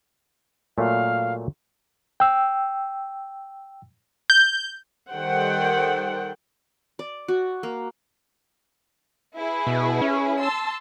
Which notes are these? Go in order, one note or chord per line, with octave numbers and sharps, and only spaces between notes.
A#2 F#3 A3 F5
G5 E6
G6
D#3 G3 A4 C5 F#5 G5
D5
F#4
A#3
E4 G#4 B4
B2
C#4
A5 C6 E6